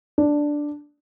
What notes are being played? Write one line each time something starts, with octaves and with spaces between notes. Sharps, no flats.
D4